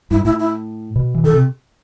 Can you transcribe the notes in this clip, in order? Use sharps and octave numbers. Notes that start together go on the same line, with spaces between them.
G2 E4
A2 E4
E4
B2
E3
D#3 A4
C3